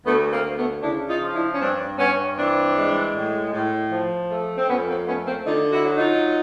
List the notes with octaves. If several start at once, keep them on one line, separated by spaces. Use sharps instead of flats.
D2 A3 B3
A#3 C4
D2
A3 B3
C#3 D4 E4
D#4 F4
F3
D4 E4
C#4
G2 C4 D4
G2 B3 C#4
E3 C4 D4
G#3
A2
A2
F3
A3
C4
F2 B3 C#4
A#3 C4
A3 B3 C#4
A#3 C4
D3 D#4 F4
E4 F#4
F#3
D#4 F4